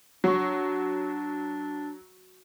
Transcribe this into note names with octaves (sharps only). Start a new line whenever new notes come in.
F#3 D4 F#4 C#6